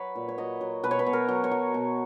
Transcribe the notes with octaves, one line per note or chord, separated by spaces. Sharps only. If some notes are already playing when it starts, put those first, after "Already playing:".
Already playing: F#3 B4 C#5
A#2
C#5
F#3 D#5
F#3
B2 B4
C#5
B4
B2
A#4
F#3
C#5
F#3
B2